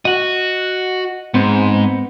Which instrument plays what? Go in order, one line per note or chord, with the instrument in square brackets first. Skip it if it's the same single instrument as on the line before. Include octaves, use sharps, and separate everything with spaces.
[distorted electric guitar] F#4 [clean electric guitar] D#5 F#5
[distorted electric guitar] G#2 [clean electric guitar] B3 C4 C5